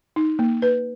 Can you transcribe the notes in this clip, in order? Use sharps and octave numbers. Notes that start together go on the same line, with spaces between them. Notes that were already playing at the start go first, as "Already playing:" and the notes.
D#4
A#3
B4